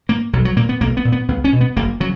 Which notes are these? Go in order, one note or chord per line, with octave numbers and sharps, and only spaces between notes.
G#2 A#3
B1 F#3
F#3
A#2 A#3
B3
B1 A#3
B3
A#2
B3
C#2 B3
C#4
B2
B3
F#1 A#3
C#3 F#3